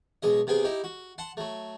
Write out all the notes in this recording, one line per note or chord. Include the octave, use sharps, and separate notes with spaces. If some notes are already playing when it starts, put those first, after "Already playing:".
B1 G#3 D#5
C3 B3 G#4 G5
D#4 E4 G4
F#4
F#5 A5 C6
F#3 A3